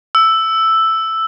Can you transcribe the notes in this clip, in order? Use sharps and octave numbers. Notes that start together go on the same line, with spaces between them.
E6